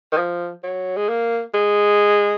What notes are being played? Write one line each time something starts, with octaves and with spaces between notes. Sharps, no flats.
D#3
F3
F#3
G#3
A#3
G#3